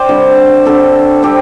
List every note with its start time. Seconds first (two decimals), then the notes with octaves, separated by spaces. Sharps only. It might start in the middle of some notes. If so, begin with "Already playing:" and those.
Already playing: C5 D5 G5
0.09 D3 G3 C4
0.65 D3 G3 C4 A4
1.23 G3 C4 G4